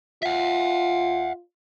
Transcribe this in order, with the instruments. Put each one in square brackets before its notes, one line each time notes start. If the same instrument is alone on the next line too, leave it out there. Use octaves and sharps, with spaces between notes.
[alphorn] F4 [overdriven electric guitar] E5 F#5